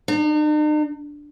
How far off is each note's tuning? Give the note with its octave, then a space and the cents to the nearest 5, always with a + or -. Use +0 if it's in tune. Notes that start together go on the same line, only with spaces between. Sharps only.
D#4 -45